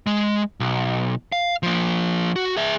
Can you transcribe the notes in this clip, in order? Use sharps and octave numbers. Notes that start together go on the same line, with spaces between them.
G#3
B1
F5
F3 A#3
F#4
G#4 E5